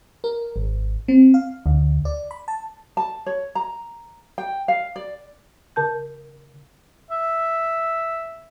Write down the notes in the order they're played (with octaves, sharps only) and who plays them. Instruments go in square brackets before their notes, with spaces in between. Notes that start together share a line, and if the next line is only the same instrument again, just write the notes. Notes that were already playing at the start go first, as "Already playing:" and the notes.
[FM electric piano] A#4
G#1
C4
F5
D2
D5
B5
A5
[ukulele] A5
C#5
A#5
G5
F5
D5
[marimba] C#3 A#4 A5 G6
[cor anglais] E5